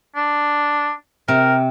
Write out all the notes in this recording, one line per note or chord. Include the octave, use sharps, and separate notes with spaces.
D4
C3 A#4